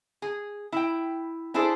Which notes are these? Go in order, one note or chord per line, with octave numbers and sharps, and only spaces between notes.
G#4
E4 G5
D4 E4 G#4 A4 C5